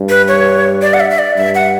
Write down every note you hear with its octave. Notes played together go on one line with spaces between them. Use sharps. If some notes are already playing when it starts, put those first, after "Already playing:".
Already playing: G2
B4
C#5
D5
F#5
E5
E5
D5
G2 E5
F#5